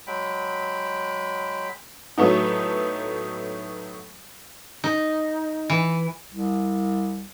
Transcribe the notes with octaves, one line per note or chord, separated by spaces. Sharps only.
F#3 G#3 G5 B5
A2 F#3 A3 B3 D#4
D#4
E3
C2